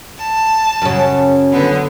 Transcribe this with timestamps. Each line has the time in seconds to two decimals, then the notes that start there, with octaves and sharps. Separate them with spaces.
0.17 A5
0.82 F#2 C#3
1.51 D3 B3